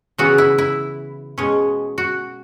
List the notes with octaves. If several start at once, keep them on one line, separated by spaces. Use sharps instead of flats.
C#3 E3 B3 F#4
E4
E4
B2 G#3 C#4
F#4